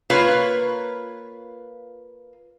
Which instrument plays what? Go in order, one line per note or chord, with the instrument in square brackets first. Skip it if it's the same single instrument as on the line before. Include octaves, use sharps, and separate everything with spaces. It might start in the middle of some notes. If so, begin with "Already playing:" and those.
[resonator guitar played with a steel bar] A#3 F4 B4 C#5